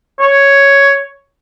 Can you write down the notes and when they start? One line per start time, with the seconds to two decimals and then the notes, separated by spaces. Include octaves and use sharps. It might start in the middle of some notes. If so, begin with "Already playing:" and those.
0.20 C#5